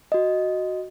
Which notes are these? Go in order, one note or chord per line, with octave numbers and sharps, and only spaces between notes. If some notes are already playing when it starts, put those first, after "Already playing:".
F#4 D#5